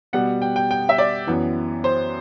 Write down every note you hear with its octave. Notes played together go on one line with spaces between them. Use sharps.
B2 G3 B3 F#5
G5
G5
G5
E5
D5
F#2 E3 B3
C5